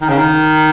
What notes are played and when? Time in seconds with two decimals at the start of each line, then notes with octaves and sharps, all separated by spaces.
0.01 D#3
0.09 C#3
0.17 D#3